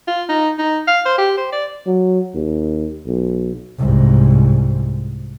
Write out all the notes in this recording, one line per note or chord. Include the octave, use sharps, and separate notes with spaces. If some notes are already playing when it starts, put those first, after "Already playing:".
F4
D#4
D#4
F5
C5
G4
C5
D5
F#3
D#2
B1
C2 G#2